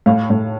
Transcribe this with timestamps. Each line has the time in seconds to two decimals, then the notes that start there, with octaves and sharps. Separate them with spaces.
0.06 A2 F5
0.30 A2